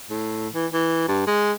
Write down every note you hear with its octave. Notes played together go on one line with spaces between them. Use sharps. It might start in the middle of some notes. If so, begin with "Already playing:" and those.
A2
E3
E3
G2
G#3